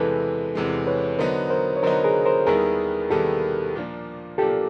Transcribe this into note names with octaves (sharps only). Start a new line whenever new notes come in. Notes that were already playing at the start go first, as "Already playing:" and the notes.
Already playing: E2 C3 E3 G#3 A4 B4
E2 C3 E3 G#3
B4 C#5
D3 F#3 B3 D#4 A#4 C5
A#4 C5
C#5
D3 F#3 B3 D#4 A#4 C5
G#4 A#4
A#4 C5
D#2 D#3 G3 B3 E4 G#4 A#4
D#2 D#3 G3 B3 E4 G4 A4
A#2 F3 A#3 D4
A#2 F3 A#3 D4 G4 A4